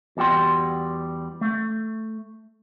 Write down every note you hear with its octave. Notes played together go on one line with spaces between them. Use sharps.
E2 G3 F#4 G5 C6
A3